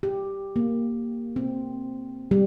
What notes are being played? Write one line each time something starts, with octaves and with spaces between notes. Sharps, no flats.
G4
A#3
C4
G3